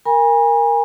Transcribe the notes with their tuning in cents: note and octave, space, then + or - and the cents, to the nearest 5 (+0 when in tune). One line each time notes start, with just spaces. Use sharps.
A#4 +0 G#5 -30 B5 -45